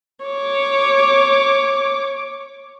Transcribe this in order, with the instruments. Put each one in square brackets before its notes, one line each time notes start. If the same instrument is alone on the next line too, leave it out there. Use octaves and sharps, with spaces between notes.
[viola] C#5 D6